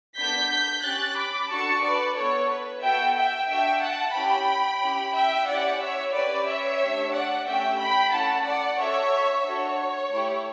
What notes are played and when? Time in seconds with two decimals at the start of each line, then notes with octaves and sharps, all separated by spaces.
0.17 B3 D4 A4 G6 B6
0.50 G6 B6
0.83 C#4 G4 F#6 A6
1.16 B5 D6
1.49 D4 F#4 A4 A5 C#6
1.83 B4 D5
2.16 B3 E4 A4 C#5
2.49 B4
2.81 B3 F#4 A4 E5 G5
3.15 E5 G5
3.48 D4 F#4 A4 E5 G5
3.81 F#5 A5
4.14 C#4 E4 G4 G5 B5
4.81 C#4 E4 G4
5.14 E5 G5
5.47 C#4 E4 G4 D5 F#5
5.80 C#5 E5
6.13 C#4 G4 B4 D5
6.46 C#5 E5
6.79 A3 D4 G4
7.13 D5 F#5
7.46 A3 C#4 G4 E5 G5
7.79 G5 B5
8.12 A3 C#4 E4 F#5 A5
8.45 D5 F#5
8.78 C#4 F#4 A4 C#5 E5
9.45 D4 F#4 A4 C#5
10.11 A3 E4 G4